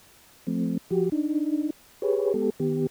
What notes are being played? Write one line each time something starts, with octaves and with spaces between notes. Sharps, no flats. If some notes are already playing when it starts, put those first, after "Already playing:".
F3 A3 C4
F3 F#4 G4
D4 D#4
G4 G#4 B4 C#5
G#3 B3 G4 A4
D#3 B3 G4